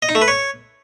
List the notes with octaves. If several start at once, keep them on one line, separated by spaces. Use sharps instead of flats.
D#5
D#4
A3
B4
C#5